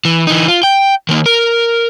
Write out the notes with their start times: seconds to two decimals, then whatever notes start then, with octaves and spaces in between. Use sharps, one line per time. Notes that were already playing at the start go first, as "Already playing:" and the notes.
0.05 E3
0.27 E3 D#4
0.48 F4
0.63 G5
1.09 D#3 A#3
1.26 A#4